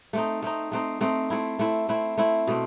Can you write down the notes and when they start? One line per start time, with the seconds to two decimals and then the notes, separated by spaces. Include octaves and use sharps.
0.13 A3 C4 D#4
0.42 A3 C4 D#4
0.72 A3 C4 D#4
1.01 A3 C4 D#4
1.30 A3 C4 E4
1.59 A3 C4 E4
1.89 A3 C4 E4
2.17 A3 C4 E4
2.47 B2 A3 C4